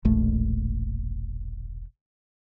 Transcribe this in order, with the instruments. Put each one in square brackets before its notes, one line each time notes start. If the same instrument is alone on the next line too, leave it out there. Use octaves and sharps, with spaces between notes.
[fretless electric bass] E1 A#1 A3